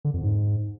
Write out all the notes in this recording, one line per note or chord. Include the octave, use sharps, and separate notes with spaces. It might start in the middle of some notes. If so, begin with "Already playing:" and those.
D3
F2
G#2